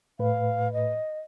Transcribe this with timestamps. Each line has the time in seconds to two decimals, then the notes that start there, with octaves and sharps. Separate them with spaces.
0.19 A2 B4 F5
0.73 D#5